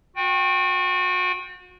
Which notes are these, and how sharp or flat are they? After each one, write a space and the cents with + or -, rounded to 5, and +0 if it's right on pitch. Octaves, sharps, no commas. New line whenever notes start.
F#4 -35 G5 +0